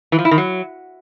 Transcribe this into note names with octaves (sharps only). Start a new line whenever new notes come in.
E3
F3
E4
D#3
F#3